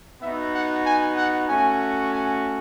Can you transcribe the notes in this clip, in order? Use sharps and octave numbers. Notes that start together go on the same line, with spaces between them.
B3 D#4 F#4 E5
F#5
G#5
F#5
A3 C#4 F#4 G#5
G#5